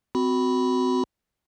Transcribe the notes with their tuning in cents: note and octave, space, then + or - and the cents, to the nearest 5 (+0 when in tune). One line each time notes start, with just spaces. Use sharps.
C4 -30 F#4 +0 B5 +0